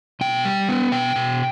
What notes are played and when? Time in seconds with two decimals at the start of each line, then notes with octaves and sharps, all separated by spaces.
0.21 B2 G5
0.45 G3
0.69 B3
0.92 B2 G5
1.16 B2